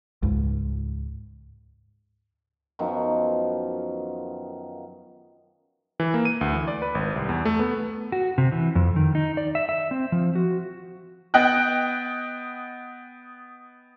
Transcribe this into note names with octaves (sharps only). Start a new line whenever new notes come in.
C#2 G#2
F#2 D#3 F3 B3
E3
A#3
D#7
D2
E3
D5
B4
G#1
C2
E2
A3
B3
F#4
C3
E3
F2
D#3
D#4
D5
E5
E5
C4
F3
F#4
B3 D#5 G5 F#6